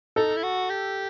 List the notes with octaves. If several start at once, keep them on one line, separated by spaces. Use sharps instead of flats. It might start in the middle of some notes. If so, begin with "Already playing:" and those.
D#4 A4
E4
F#4
G4